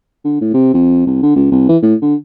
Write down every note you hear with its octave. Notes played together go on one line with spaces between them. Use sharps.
D3
A2
C3
F2
C2
D3
C#2
C2
E3
A2
D3